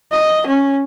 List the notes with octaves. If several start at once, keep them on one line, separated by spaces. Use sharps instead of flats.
D#5
C#4